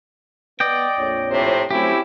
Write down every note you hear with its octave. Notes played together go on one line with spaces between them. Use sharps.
B3 D5 D#5 G5
A#1 F2 C#5
A2 C3 C5
F#3 G3 A3 C4 C#4 E4 G4